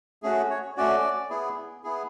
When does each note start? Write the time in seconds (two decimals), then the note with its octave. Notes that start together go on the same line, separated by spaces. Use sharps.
0.23 A3 C#4 F#4 G#4
0.50 C#5
0.77 A3 C#4 F#4 D5
1.30 B3 E4 G#4
1.84 B3 E4 G#4